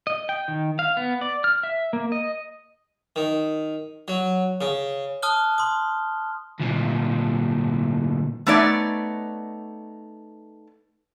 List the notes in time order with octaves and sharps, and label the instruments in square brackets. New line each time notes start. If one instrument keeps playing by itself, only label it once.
[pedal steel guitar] D#5
G5
D#3
F5
B3
D5
F6
E5
A#3
D#5
[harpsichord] D#3
F#3
C#3
[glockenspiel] A5 D#6 F6 F#6 G7
C6 D#6
[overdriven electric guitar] D2 A#2
[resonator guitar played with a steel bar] A3 B3 D#4 C#5 D5